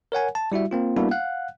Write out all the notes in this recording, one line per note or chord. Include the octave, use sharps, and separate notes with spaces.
A#4 C#5 F#5 G#5
A5
G3 E4 F#4 E5
A#3 C4 F4
G3 A#3 B3 D4 E4 F#4
F5 F#5 F#6